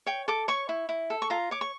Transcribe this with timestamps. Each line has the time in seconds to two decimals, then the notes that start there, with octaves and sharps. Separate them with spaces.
0.06 C#5 G5
0.28 A4 D6
0.48 C#5 C#6
0.69 E4
0.89 E4
1.10 A4
1.22 C#6
1.30 F4 A#5
1.51 C#5 D6
1.61 C#6